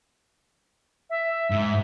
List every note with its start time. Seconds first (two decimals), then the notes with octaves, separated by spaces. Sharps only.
1.10 E5
1.50 G#2